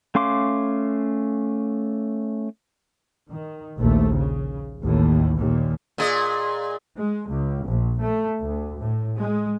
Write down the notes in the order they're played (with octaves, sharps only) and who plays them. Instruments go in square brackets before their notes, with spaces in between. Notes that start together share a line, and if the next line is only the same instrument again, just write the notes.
[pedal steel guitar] A3 C#4 F5 C6 D6
[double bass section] D#3
A#1 D#2 A3
C#3
A1 D#2 A2
D#2 A#2
[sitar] A#2 G#4 D#5
[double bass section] G#3
C#2
A#1
A3
D2
A2
G#3